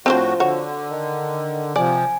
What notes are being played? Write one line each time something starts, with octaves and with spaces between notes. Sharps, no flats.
A2 F3 C4 D4 F#4 C5
D3 F#4 C#5
D#3
C3 F3 D5 G#5